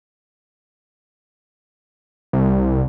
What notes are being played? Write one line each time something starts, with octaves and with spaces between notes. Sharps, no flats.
C2